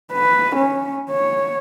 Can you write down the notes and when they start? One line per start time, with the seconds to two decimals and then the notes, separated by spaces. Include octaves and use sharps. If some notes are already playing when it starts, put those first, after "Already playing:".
0.13 B4
0.56 C#4
1.10 C#5